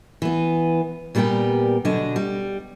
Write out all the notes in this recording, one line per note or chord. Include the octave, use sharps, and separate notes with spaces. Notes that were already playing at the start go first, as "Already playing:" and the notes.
E3 B3
A#2 G3 B3 F#4 G4 A#4
B2 D3 F#3 D4 D#5
G3